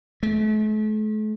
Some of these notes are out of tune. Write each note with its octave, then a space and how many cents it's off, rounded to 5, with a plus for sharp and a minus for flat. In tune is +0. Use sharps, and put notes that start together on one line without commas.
A3 -40